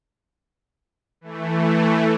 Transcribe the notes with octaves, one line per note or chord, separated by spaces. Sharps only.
E3 A3